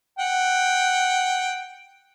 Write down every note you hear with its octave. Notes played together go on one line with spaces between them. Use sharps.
F#5 G5